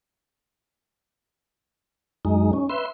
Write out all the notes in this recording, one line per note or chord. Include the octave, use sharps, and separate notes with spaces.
F#2 G#3 D#4
C#4
B4 E5 C6